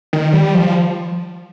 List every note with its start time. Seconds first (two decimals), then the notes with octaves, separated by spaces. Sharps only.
0.13 D#3
0.33 G3
0.54 F3